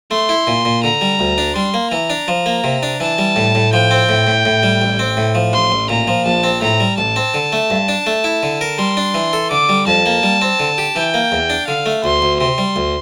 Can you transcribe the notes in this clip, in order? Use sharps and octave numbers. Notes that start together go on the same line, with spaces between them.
A3 C6
E4
A#2
A#2
D3 A#5
G3
D2
D4
G3 C6
A#3
E3 A#5
D4
F3
A#3
C3
D4
E3 A5
G3
A2
A2
F3 G5
C4
A2
A2
A2
G3
A1
C4
A2
F3
A1 C6
A1
A#2 A#5
F3
A#1 A5
C4
A2 A#5
G3
A1 A5
C4
D3
A3
G2
D4
A3
E4
D3
A#4
G3 C6
D4
E3
A4
D3 D6
G3
F2 A5
A#3
G3
C4
D3
G4
E3 G5
A#3
E2
D4
D3 F5
A3
D2 C6
D2
C3 C6
G3
D2